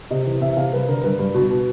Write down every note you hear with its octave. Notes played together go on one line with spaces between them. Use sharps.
C3 D#5
E3
C3 E5
C3 F5
G3 B4
D3 A#4
G2 B4
G2
B2
B2